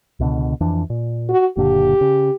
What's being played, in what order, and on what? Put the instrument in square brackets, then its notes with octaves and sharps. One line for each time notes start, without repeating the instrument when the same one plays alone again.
[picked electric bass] C#2 B2 D3
F2 E3 D4
A#2
[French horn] F#4
[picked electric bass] F#1 A#2 D3 [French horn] G4
[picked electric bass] C#3